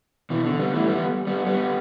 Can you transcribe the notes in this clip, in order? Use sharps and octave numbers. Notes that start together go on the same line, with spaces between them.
B2 E3
D3
G3 B3
E3 A3
G3 B3
G3 B3
G3 B3